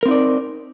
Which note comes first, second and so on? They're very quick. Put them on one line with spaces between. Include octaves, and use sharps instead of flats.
A#4 C4 D#4 D5